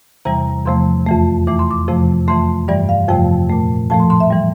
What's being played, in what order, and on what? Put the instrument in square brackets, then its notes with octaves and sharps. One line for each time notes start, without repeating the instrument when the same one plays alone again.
[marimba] E2 C3 E3 G3 A#5
E2 C3 F3 A3 C6
F2 E3 A3
E2 E3 A3 D6
C6
D6
F2 C3 F3 A3
F2 E3 A3 C6
G2 E3 G3 D5
F5
F2 C3 F3 A3 G5
A#2 A3
A2 F3 A3 A5
C6
C6
E5
E3 G3